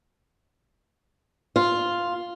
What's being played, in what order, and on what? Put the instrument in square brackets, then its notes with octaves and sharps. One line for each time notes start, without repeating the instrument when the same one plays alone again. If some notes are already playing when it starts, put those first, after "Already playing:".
[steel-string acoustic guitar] F4